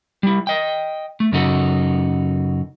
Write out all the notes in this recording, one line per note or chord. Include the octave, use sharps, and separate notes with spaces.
G3 E4
D#5 G5
A3
F#2 C#3 D#4 F#4 A4